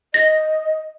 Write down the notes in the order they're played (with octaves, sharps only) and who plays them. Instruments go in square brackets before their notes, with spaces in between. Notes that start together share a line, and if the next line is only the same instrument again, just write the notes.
[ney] D#5 [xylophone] A#6